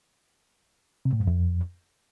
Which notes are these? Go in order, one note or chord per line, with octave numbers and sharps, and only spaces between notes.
C3
A2
G2
F2